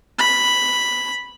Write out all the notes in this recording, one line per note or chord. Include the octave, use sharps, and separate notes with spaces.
B5